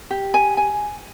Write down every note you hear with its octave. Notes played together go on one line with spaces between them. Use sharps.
G4
G#5
G#5